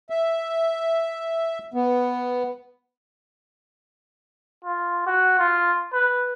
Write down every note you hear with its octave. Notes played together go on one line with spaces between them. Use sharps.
E5
B3
F4
F#4
F4
B4